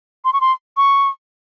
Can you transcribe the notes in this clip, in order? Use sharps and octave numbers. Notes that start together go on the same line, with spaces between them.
C6
C#6
C6
C#6